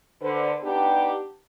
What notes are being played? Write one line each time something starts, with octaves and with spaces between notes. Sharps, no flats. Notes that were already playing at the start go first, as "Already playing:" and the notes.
D3 B4 C5
B3 D4 D#4 G4